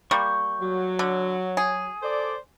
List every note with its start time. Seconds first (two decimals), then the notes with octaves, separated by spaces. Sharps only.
0.11 G3 A#3 C#6 G6
0.61 F#3
0.99 D3
1.57 G#4
2.03 A4 C5 D5